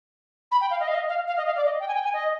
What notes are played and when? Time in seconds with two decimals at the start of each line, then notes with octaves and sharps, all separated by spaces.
0.51 B5
0.61 G5
0.70 F5
0.80 D#5
0.87 F5
0.94 D#5
1.08 F5
1.27 F5
1.37 D#5
1.46 F5
1.56 D5
1.65 D#5
1.80 G5
1.87 G#5
1.94 G5
2.03 G#5
2.13 D#5